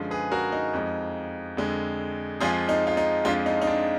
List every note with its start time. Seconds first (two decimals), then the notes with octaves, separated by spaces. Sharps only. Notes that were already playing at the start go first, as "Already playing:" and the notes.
Already playing: F#2 D3 F3 G#3
0.11 G#4 B4
0.32 F#4 A#4
0.52 D#4
0.73 F2 F3 G#3
1.57 F2 D3 G#3
2.40 F2 F3 G#3 F4 G#4
2.69 D#4
2.87 F4
2.97 D#4
3.25 F2 F3 G#3 D4 F4
3.46 D#4
3.62 D#4
3.67 D4